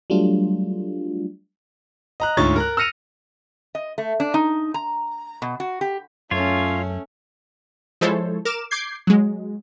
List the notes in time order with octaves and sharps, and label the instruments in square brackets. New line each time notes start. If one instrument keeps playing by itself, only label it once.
[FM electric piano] F#3 G3 A3 D4 F4
[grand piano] D#5 A#5 F#6
D2 G#2 F4 C#5 C#6 A6
A#4 A#5 F#6
E6 F6 A#6 C#7 D#7 F7
[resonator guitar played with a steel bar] D#5
A3
D4
D#4
A#5
B2
F#4
G4
[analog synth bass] F#2 [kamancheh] A3 C#4 [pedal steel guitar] F4 C#5
[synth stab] F3 G#3 E4 A4 C5 C#5
A#4 D6 F6 E7
D6 G6 G#6 C7
F#3 G#3